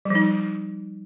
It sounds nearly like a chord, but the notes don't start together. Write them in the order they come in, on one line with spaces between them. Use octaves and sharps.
G3 F3 D#4